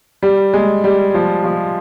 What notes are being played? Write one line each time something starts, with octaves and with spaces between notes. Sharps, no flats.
G3
G#3
G3
F3
F3